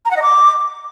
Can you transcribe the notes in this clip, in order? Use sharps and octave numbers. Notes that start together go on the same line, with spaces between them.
A#5
F#5
D#5
D6